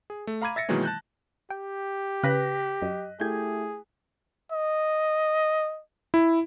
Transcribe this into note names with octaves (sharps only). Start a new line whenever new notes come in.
G#4
A3
F5 A#5 B5 D6 G#6 D#7
E5 A6 A#6 C#7
B2 D#3 E3 F#3 G#3 A#3
A5 F#6 G6
G4 G5
C#3 B4 F#6 A#6 B6
F#2 D#5
A3 E4 G4 G#4 G6 G#6
D#5
E4